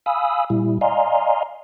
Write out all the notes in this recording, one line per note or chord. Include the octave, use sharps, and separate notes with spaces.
F5 G#5 B5 D#6 E6
A#2 G3 E4
D5 D#5 F5 G#5 A#5 C6